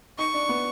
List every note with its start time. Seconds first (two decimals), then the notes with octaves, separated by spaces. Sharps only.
0.18 D#4 C#6
0.34 D4
0.49 B3